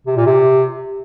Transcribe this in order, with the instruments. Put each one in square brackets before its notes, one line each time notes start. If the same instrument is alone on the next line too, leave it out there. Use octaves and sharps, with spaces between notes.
[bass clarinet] C3
A#2
C3